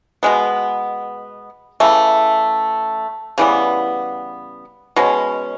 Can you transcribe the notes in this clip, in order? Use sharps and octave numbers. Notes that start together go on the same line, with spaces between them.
B2 G#3 B3
C#3 E3 A3
C#3 E3 G3 B3
B2 G#3 C#4